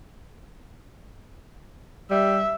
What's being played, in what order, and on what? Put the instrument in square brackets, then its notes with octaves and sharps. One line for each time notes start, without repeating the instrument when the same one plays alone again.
[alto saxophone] G3 [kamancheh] E5